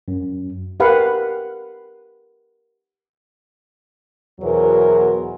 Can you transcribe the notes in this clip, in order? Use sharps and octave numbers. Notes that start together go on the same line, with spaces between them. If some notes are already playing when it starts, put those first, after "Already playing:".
F#2
G4 A#4 B4 F5 F#5
E2 B2 F#3 G#4 A#4 C5